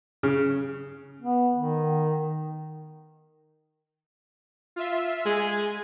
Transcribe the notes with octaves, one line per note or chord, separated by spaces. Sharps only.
C#3
B3
D#3
F4 E5
G#3 G#5